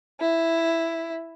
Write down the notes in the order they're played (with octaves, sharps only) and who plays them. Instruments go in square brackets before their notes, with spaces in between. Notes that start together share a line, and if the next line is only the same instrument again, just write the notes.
[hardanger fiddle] E4